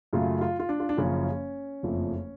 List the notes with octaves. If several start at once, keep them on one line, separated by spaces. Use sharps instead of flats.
F#2 C#3 F#3 A3 F4
F4
F4
D4
F4
D4
F#1 F#2 C#3 F3 C#4
F#1 F2 F3 A3